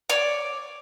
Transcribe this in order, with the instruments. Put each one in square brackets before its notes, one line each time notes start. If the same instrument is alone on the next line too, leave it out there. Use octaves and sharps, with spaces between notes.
[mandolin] C#5 D5